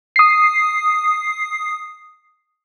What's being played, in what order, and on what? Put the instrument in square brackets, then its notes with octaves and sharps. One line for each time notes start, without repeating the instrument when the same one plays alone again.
[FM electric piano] D#6 C7